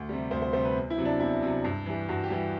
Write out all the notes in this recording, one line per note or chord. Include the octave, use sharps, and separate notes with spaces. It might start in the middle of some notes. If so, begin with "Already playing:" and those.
Already playing: D2
C3 G3
D2 C5
C5
C3 G3 C5
B4
E2
E4
C3 F#3
D4
E2 E4
C3 F#3
G2
E3 G3
G2 F#4
G4
E3 G3